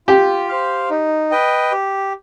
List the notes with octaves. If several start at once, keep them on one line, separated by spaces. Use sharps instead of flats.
F4 G4
C5 F5
D#4
B4 D#5 G5
G4